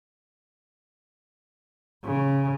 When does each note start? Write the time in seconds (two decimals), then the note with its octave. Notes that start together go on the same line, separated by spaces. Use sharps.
2.05 C#3